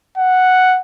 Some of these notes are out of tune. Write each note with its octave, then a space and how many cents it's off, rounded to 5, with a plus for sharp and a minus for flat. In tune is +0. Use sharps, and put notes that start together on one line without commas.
F#5 +0